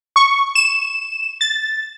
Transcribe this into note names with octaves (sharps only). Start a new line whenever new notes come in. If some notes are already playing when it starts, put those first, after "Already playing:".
C#6
E7
A6